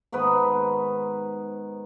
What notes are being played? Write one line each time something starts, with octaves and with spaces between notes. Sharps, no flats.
G#2 D#3 B3 B4